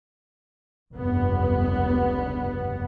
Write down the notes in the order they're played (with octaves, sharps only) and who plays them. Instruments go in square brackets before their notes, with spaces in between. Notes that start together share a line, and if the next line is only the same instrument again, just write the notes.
[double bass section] F1 C#2 G2 B3